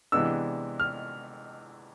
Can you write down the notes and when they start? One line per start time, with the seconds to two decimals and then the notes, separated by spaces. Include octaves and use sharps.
0.12 C3 E3 G#3 B3 D4 E6
0.80 F6